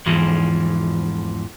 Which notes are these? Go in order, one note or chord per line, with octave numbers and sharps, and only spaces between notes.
E2 G#2 E3 F3